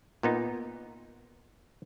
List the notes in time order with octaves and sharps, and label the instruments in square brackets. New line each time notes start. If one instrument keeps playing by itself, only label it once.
[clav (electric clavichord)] A#2 B3 D#4